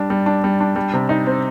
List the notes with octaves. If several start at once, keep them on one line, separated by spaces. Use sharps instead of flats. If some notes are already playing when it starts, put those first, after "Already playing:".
Already playing: G3 D4
G3
D4
G3
D4
G3
C3
D#4
C4